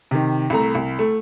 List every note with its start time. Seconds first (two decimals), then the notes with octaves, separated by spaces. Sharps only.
0.11 C3 D#3
0.50 C2 A3 A#5
0.75 C2
0.99 A3